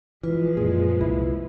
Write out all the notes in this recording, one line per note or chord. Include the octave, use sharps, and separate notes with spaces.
E3 F3 G#3 F4 B4
F#2 A#2 G#4
C2 E4